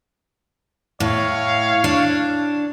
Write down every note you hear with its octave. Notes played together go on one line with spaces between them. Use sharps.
A2 C#5 F5
D4